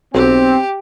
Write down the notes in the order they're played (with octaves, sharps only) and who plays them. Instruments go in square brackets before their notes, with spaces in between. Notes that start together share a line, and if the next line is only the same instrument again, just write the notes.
[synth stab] B1 [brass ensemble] C4 [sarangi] G4